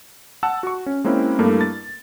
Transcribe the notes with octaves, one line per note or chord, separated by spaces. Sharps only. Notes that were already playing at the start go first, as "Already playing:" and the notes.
F#5 A5 E6
F#4 C#6
C#4
G#3 A#3 C4 C#4 E4
G2 A3 A#3 E4
A6